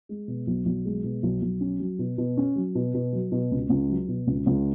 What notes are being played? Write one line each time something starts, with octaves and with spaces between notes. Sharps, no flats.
G#3
B2
B1
B1
G#3
B2
B1
B1
C#4
F#3
B2
B2
C#4
F#3
B2
B2
F#3
B2
C#2
C#2
F#3
B2
C#2
C#2